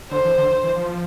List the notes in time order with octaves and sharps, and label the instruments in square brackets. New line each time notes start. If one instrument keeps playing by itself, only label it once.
[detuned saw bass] D3 [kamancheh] C5
[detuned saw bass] E3
D3
E3
F3